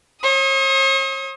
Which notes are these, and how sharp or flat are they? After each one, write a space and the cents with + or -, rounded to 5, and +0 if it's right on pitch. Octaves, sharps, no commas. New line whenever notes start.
C#5 -45 D#6 +25